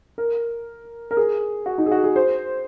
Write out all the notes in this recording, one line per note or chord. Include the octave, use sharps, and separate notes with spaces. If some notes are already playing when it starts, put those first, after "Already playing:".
A#4
A#4
G#4
F#4
D#4
G#4
F#4
G#4
C5